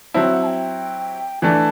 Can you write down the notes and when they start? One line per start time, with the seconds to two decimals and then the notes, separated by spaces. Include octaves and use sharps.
0.14 F#3 C4 E4 A5
0.23 G5
0.32 F#5
0.42 A5
0.47 G5
1.42 E3 A3 D4 A5